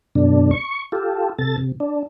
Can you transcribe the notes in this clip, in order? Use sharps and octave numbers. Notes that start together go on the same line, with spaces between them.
F#2 B2 D3 D4
C#6
F4 G4 A4
C3 A4 A6
C3
D4